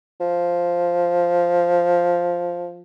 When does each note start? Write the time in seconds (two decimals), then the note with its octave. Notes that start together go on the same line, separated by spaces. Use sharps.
0.20 F3